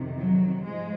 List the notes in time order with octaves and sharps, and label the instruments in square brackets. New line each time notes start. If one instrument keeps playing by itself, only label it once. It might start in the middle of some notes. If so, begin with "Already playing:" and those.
Already playing: [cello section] F2 C3 D#3
F#3
G#2 F3 G#3